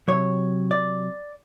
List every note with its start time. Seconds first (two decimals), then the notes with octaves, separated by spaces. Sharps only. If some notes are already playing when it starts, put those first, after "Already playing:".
0.08 C3 D#3 F#3 C#5
0.71 D5